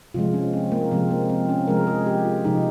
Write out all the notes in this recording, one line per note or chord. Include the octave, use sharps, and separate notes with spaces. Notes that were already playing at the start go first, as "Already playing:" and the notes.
C3 F3 G#3 F4
C#4
C4
A#3
C3 F3 G#3 C4
A#3
C4
C#4
C3 F3 G#3 A#4
G#4
G4
F4
C3 F3 G#3 D#4